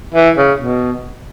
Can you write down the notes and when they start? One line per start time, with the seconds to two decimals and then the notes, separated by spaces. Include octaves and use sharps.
0.14 E3
0.37 C#3
0.60 B2